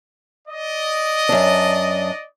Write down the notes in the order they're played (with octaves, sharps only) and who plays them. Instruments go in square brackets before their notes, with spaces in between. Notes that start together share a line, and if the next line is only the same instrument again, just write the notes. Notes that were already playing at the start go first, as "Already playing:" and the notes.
[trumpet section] D5 D#5
[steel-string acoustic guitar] F#2 D4